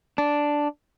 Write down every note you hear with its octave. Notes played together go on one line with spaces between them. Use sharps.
D4